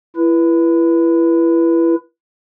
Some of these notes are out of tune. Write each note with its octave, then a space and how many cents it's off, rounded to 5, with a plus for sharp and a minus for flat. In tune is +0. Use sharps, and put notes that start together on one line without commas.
E4 +25 B4 -25